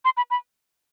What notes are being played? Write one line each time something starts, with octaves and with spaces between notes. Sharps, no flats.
C6
B5
B5